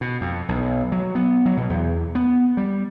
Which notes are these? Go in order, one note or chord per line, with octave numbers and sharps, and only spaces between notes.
B2
F2
B1
F#3
B3
F#3
B2
E2
B3
G3